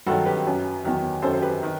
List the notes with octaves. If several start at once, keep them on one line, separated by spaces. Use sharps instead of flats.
G2 D#3 F#3 F#4 A4
G4 B4
F#2 F#3
E2 D#3 F#3
F#2 D#3 F#3 A4 C5
C5
G4 B4
D#3